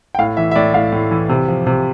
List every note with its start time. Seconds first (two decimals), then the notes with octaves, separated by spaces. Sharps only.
0.15 G5
0.19 A2 F5
0.37 E3 E5
0.51 E5
0.55 A2 D5
0.74 A2 F5
0.92 A2
1.11 E3
1.29 C3
1.48 F3
1.67 C3